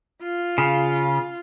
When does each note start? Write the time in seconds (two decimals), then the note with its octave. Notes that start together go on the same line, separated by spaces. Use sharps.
0.22 F4
0.58 C#3